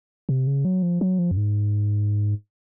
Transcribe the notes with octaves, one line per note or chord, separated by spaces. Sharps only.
C3
C#3
F#3
F3
F#3
F3
F#2
G#2